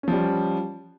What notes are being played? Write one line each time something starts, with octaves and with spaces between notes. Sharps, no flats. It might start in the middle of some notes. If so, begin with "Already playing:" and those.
F3 G3 C#4